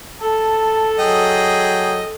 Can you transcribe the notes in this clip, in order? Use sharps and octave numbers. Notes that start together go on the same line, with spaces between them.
A4 A5
F#3 G#4 D#5 G5